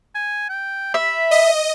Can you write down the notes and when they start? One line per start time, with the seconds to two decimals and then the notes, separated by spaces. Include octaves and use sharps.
0.15 G#5
0.49 G5
0.94 E5 B5
1.31 D#5